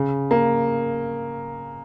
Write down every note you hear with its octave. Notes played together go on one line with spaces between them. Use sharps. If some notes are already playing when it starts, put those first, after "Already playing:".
Already playing: C#3
A#3